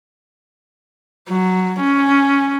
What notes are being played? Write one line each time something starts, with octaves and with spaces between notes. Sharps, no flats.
F#3
C#4